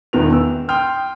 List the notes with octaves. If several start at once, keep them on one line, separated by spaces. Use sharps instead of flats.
E1 E2 D#3 B3 F7
E6
G5 C6 D#6 F6 G6